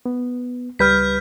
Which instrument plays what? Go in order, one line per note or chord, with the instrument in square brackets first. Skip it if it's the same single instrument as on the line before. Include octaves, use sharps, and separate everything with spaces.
[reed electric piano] B3
[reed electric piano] C#2 G3 B4 [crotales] F6 G6 B6